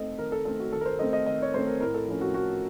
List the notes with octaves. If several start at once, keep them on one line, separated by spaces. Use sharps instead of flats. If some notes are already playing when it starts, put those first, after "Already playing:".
Already playing: A3 C4 D#4 A4 D#5
D#3 A#4
A4
A3 C4 D#4 A4
F#4
D#3 A4
A#4
C5
A3 C4 D#5
D#5
D#3 D#5
C#5
A3 C4 C5
A#4
A2 A#4
A4
F3 A#3 C#4
F#4
A2 F#4